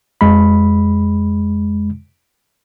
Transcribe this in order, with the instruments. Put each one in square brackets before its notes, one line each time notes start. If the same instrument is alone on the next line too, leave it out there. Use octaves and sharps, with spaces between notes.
[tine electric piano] F2 G#3 B5